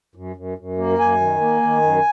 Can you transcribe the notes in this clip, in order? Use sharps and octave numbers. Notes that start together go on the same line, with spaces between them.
F#2
F#2
F#2
A#3
F#2 G#5
D#3
A#3
D#3
F#2